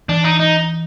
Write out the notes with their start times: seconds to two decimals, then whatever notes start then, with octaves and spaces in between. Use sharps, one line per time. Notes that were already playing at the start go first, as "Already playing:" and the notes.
0.09 E3 D4
0.24 D#4
0.39 D#4